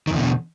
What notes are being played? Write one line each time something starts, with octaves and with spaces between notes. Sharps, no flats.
E2 B2 D3 D#3